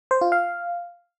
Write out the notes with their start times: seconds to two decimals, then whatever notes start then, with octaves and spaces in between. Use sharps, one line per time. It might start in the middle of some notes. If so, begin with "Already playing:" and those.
0.11 C5
0.21 F4
0.32 F5